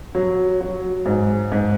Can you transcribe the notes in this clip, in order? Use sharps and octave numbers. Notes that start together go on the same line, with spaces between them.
F#3
F#3
G#2
G#2